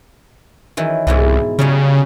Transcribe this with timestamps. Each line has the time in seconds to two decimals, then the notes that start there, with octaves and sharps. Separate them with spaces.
0.77 D#3 E3 F#3
1.07 C2 G#2 B2 E3
1.59 C#3 F#3 G3 C#4